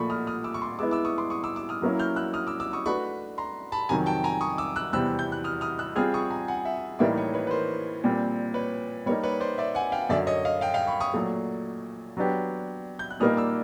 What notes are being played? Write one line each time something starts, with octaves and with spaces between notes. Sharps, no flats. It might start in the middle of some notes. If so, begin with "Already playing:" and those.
Already playing: A#2 F3 A3 B5 C#6
D#6 F6
D#6 F6
D6 E6
C#6
C6 D6
G#3 B3 E4 D6 E6
D6 E6
C#6 D#6
C6 D6
C#6 D#6
D6 E6
D6 E6
D#6 F6
F#3 A#3 C#4 E4
F6 G6
E6 F#6
D#6 F6
D6 E6
D6 E6
C#6 D#6
A3 D4 F#4 B4 B5 C#6
A#5 C6
A5 B5
F2 C3 D#3 F#3 G#5 A#5
G5 A5
G#5 A#5
C#6 D#6
D6 E6
E6 F#6
E2 C3 E3 G3 C4 E6 F#6
G6
F#6
D#6 F6
D#6 F6
E6 F#6
G3 C4 F4 G#4 D#6 F6
C#6 D#6
G#5 A#5
F#5 G#5
E5 F#5
A2 E3 G3 A#3 D#4 D5 E5
C#5 D#5
B4 C#5
B4
A#4 C5
A#2 G3 C4
B4 C#5
G3 A#3 D#4 B4 C#5
B4 C#5
C5 D5
D5 E5
F#5 G#5
F5 G5
F#2 D3 F#3 D5 E5
C#5 D#5
D#5 F5
F5 G5
F5 G5
B5 C#6
C#6 D#6
A#2 F#3 A3
F#3 B3 D4 G4
G6
F#6
A#2 G3 A#3 D#4 D#6 F6
D6 E6